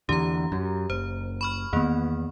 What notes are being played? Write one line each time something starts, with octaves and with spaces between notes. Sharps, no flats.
E2 D3 G4 A#5
F#2
F#1 C5
B5 C#6 F6
E2 D#3 A#3 B3